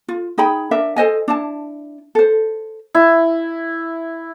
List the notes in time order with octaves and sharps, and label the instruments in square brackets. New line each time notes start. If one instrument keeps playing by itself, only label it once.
[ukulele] F4
D#4 G#4 G5 B5
D4 A#4 E5
A4 C5 D#5 G#5
D4 E4 A5
A4 C5
[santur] E4